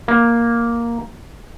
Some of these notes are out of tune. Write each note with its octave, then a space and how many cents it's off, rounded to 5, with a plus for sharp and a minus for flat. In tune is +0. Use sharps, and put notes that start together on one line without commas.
A#3 +5